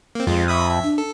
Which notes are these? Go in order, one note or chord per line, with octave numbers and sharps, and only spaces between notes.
A#3 C4
F2 G#3 F4
E5 B5 D#6
E5
D4
A4